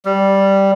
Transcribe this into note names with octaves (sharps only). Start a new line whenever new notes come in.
G3